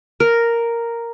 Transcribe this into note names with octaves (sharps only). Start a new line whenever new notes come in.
A#4